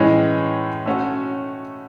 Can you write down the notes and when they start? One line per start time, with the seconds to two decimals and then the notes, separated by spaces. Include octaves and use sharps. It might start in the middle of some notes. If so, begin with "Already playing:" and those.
Already playing: A2 E3 G#3 C#4
0.86 A3 C#4 F#4